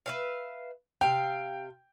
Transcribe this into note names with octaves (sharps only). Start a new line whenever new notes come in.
B4 E5 F5
C3 F5 G5